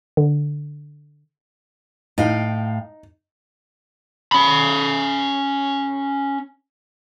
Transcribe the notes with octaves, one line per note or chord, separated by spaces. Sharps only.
D3
A2 D#4 F5 G5
C#4 B5